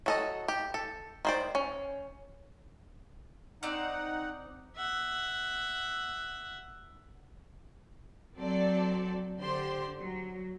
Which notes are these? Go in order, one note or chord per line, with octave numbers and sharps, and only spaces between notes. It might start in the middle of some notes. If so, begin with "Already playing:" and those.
F#3 A4 D#5
G4
A4
D#3 C5 D5
C#4
C4 D#4 D5 F#5
E5 F#5
F#3 C4 A4 D5
D3 G4 C5 D5 C6
F#3